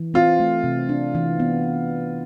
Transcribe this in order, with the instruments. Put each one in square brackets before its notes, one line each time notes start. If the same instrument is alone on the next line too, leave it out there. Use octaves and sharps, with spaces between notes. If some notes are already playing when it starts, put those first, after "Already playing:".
Already playing: [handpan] E3
[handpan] C4 [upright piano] F4
[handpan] A3
C3
D4
E3
B3